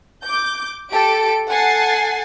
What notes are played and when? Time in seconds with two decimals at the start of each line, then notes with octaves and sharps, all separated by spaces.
0.25 D6 G6
0.91 G4 A4 D7
1.48 A4 F#5 G#5 A5 A6 C7